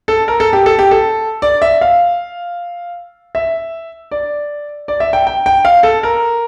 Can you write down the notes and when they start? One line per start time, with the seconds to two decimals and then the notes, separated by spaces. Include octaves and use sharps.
0.08 A4
0.28 A#4
0.40 A4
0.53 G4
0.66 A4
0.79 G4
0.91 A4
1.42 D5
1.62 E5
1.81 F5
3.35 E5
4.11 D5
4.88 D5
5.00 E5
5.13 G5
5.27 G5
5.46 G5
5.65 F5
5.83 A4
6.03 A#4